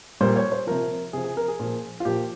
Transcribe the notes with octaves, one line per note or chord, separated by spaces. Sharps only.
A#2 G3 C5
C#5
C5
C3 F3 A#4
C3 F3 G#4
G#4
A#4
G#4
A#2 F3
F4
A#2 F3 G4